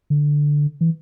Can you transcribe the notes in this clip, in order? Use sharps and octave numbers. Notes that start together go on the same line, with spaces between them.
D3
E3